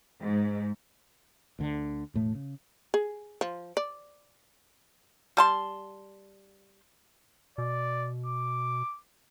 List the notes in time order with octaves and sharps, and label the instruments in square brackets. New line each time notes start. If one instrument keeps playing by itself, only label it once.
[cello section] G#2
[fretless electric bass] D2 D3
E1 A2 A3
C#3
[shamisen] G#4
F3
D5
[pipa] G3 A5 C6
[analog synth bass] B2 [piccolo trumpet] D5
[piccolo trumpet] D6